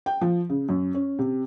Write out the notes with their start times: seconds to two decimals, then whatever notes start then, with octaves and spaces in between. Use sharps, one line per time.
0.06 G5
0.21 F3
0.49 C#3
0.69 F#2
0.94 C#4
1.19 C3